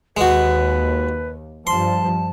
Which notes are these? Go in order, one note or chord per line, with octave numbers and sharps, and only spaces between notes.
D#2 G#3 F#4 B4
G2 F3 A5 C6